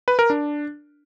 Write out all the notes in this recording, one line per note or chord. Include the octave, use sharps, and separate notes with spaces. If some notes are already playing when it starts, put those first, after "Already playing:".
B4
A#4
D4